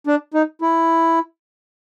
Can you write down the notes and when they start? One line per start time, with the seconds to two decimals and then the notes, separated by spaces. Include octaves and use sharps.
0.07 D4
0.34 D#4
0.62 E4